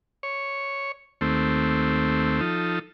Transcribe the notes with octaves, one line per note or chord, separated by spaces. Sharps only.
C#5
D#2 A3 C4
F3 D#4 A4